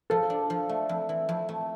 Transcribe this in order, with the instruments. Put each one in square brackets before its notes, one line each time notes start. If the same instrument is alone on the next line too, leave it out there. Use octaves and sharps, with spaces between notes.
[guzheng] F3 [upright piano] A4
[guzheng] D4
F3
A3
F2
E3
F2
A3